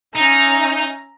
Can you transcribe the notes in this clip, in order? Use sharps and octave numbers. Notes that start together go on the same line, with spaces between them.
C#4 D#4 E5 A#5